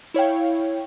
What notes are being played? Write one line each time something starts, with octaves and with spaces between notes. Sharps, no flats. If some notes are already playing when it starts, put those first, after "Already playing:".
E4 C#5 F5 G5